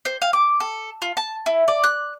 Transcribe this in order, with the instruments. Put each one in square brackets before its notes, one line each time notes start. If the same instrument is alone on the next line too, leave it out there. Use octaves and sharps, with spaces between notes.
[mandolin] C5
F5
D6
A4
F4
A5
E4
D5
F#6